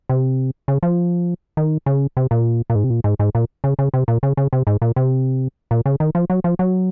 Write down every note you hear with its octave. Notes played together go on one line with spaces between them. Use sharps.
C3
C#3
F3
D#3
C#3
C3
A#2
A#2
G#2
C3
A#2
G#2
G#2
A#2
C#3
C#3
C3
A#2
C#3
C#3
C3
G#2
A#2
C3
A#2
C#3
D#3
F3
F#3
F3
F#3